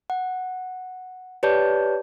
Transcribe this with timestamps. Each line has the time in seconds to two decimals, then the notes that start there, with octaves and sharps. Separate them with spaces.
0.10 F#5
1.43 G4 B4 C#5 D5 A5 G6